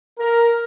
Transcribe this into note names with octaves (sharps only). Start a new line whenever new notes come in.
A#4